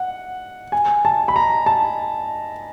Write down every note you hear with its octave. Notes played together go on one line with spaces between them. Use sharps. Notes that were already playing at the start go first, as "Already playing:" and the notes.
Already playing: F#5
G#5
A5
B5
A#5
A5